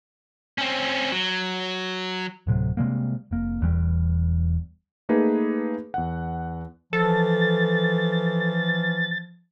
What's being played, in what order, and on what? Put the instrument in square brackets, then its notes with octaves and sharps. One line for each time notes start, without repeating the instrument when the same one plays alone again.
[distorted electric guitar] C4 C#4
F#3
[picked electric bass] D1 A2 C3 F#3
C3 G3 G#3 A#3
F1 A#3
E1 E2 C3 G3
[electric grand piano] A3 A#3 D#4 G#4 B4
E2 F#5
[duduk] E3 [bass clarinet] F3 [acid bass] A4 [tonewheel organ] A6